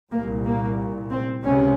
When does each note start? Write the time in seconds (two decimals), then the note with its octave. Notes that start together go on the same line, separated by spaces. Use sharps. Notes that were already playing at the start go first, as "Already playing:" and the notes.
0.12 C2 A#2 A#3
0.45 A#3
1.11 C4
1.44 C#2 C3 C#4